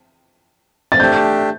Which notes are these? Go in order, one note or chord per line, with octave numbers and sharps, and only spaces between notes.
A6
A3 D4 G4 G6